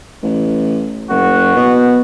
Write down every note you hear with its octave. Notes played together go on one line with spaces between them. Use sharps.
A1
F#1 F#4
B2